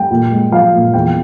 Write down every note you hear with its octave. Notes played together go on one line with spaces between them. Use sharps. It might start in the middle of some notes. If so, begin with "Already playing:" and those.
Already playing: G3 G5
A#2
G#3
F3 F5
A#2
E2 G5